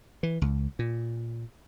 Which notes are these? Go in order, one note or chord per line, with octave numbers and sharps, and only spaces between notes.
E3
C#2
A#2